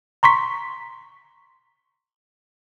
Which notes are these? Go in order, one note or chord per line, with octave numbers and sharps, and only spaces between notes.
A#5 C6 C#6 B6